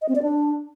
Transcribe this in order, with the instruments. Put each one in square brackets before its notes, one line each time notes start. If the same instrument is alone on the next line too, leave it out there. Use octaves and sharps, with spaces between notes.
[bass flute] D#5
C4
D5
D4